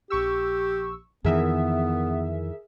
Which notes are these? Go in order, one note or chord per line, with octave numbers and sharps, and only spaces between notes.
A#1 G4 C#6 E6
F2 D#3 E3 B3 G#4 A#4 E5